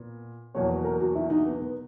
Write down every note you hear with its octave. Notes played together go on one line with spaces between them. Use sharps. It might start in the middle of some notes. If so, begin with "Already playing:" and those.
Already playing: A#2 B3
E2 B2 F#3 A#3 C#5
B4
A#4
F#4
E4
D#4
B3
B3